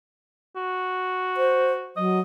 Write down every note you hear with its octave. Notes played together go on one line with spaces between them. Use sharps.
F#4
C5
F#3 D#5